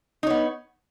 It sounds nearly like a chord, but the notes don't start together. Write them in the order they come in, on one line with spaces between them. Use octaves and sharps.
D#4 C#5 B3